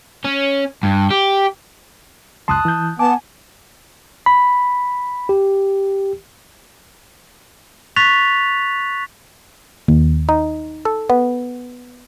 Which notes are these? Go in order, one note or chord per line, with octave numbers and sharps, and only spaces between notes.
C#4
G2
G4
C#2 F#2 A5 C6 D#6 F#6
E3 G6
B3 G#5 A5 D6
B5
G4
C#6 F#6 A6 B6 F7
D#2
D#4
A4
B3